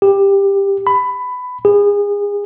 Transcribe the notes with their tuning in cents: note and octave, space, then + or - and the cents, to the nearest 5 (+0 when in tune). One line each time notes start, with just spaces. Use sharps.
G4 +15
B5 +15
G#4 -30